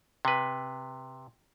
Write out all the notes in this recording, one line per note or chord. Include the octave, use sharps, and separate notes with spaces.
C3 B4